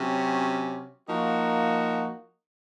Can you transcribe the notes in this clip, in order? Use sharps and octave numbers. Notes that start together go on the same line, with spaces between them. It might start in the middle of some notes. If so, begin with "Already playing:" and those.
Already playing: C3 F#3 C#4
F3 A#3 D#4 F#4